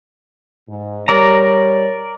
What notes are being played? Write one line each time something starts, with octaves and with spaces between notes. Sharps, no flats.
G#2
G3 A#4 C#5 D5 A#5